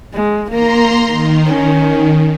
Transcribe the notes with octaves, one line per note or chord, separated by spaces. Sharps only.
G#3
A#3 A#4 A#5 C6
D#3
C#4